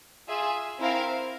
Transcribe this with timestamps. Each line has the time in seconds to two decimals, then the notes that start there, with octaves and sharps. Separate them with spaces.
0.28 F4 G#4 E5 G#5
0.79 C4 E4 A#4 F5